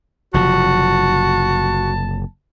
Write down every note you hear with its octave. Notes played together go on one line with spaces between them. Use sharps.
F#1 C3 F3 F#4 A5